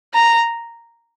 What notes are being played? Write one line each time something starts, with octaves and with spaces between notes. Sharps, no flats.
A#5